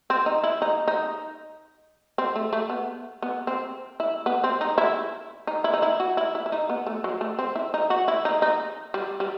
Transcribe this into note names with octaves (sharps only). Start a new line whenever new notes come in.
C4
D#4
E4
D#4
D#4
C4
A3
A3
B3
B3
C4
E4
B3
C4
D#4
E4
D#4
E4
D#4
E4
F#4
E4
E4
E4
D#4
B3
A3
F#3
A3
C4
E4
D#4
F#4
E4
D#4
D#4
G3
G3